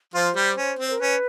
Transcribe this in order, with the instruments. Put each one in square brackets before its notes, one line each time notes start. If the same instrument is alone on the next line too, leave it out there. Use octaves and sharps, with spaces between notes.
[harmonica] F3 F4 [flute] C5
[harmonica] G3 G4
C#4
C4
[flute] A#4
[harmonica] C#4 [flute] B4